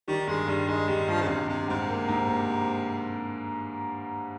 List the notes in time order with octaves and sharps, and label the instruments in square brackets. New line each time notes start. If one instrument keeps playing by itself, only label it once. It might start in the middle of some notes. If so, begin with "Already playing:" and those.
[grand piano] D#3 [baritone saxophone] G3
[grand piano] G2 [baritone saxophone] G#3
[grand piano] G2 [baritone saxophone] G3
[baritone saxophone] G#3 [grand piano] D#4
[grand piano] G2 [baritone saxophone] G3
[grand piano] G2 [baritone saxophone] F3
[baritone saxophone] C#3
[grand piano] G2 [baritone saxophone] C3
[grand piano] G2 [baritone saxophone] C3
[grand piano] G#2 [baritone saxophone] C3
[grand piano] A#3
G#2
A#3